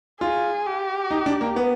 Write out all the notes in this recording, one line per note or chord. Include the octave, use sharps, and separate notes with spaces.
F4 G#4
G4
D#4
D4
A#3
B3